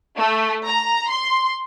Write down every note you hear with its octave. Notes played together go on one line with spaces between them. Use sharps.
A3
A#5
C6